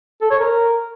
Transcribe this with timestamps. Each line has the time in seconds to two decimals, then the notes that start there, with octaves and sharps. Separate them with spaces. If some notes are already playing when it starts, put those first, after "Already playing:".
0.21 A4
0.30 C#5
0.39 A#4